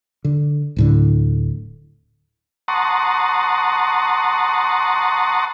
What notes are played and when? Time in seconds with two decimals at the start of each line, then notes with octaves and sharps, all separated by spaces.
0.24 D3
0.76 D1 A2 D3
2.68 F#5 A5 A#5 C6 C#6 D#6